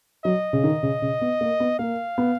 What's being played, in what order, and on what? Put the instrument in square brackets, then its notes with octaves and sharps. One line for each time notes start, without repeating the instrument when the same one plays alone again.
[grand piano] F#3 [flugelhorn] D#5
[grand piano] C#3
D#3
C#3
C#3
B3
A#3
B3
[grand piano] A#3 [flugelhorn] F5
[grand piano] B3